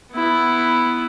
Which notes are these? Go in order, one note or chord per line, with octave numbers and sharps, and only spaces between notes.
B3 E4